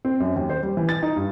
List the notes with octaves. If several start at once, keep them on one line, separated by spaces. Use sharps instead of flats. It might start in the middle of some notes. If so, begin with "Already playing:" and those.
C4
F#2
D#2
C5
G3
E3
A6
D#4
G2